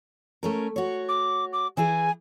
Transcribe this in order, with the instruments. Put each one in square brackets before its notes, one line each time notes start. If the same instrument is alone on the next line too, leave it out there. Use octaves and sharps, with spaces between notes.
[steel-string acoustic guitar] A3 C#4 A#4
F#4 C#5
[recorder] D6
D6
[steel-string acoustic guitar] E3 E4 G#4 [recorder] G#5